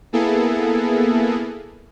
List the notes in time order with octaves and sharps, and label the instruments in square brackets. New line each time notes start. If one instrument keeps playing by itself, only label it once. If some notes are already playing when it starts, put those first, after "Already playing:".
[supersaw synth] A#3 B3 E4 G#4 A4